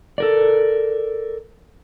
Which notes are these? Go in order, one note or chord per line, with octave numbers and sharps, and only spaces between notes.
A4 A#4 D5